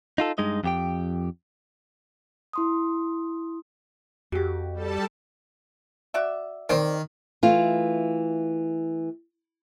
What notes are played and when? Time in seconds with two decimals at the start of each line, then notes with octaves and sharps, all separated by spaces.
0.18 D#4 F4 A4
0.38 G2 G#3 D#4 D#5
0.64 F2 G4 G5
2.53 E4 C6 D#6
4.32 F2 F#4 G4
4.73 G3 A4 A5
6.14 F#4 D5 E5
6.69 D#3 C4 C5 D5
7.43 E3 A3 F4